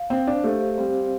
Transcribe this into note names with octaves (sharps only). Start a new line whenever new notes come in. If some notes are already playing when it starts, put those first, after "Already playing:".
Already playing: F5
C4 C5
D4
A3 G4
G3 C4